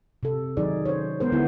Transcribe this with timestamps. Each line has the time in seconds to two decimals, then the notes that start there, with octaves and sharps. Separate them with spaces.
0.23 C3 A4
0.57 D#3 F#3 D#4 G#4 D5
0.85 C5 C#5
1.20 G#3 B3 A#4 C5
1.32 D3 B3 E4